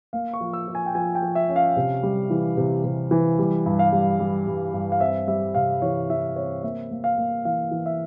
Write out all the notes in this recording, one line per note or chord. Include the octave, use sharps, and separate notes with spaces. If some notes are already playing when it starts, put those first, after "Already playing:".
A#3 F5
C#6
F3
E6
F3
G#5
G5
F3 G#5
G5
F3
E5
C#4
F5
C3
G3
E3
C3
C3
E3
G3
G2
F5
G3
G3
G2
G2
F5
C4 E5
G3 E5
C3 F5
E3 C#5
E3 E5
C4 C#5
A#3 E5
A#3
F5
A#3
E3 F5
E3
E5